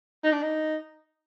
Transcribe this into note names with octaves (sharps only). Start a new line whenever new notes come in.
D#4
D4
D#4